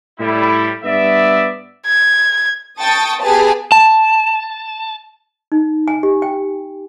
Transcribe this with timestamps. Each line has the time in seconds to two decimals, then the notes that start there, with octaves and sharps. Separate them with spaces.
0.20 A2 G3 E4
0.84 G2 B3 D5 E5
1.87 G#6
2.80 G5 A5 C#6 D#6 A6
3.22 B3 G4 G#4 B4 A5
3.72 A5
5.52 D#4
5.88 G#5
6.03 G4
6.22 G5